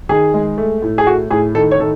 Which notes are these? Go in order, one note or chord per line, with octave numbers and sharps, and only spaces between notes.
D#3 G#4
G#3
A3
A2
G#4
A3 F#4
A2 G#4
D#3 A4
C#5
D#3 A4